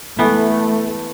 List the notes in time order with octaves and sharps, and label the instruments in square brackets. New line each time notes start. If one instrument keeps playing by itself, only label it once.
[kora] E3 B3 [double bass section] A3